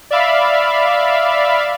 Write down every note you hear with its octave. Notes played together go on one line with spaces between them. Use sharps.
D5 E5 F5 B5